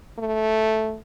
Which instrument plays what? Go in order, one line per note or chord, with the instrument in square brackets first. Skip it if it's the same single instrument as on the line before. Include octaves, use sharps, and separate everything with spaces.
[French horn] A3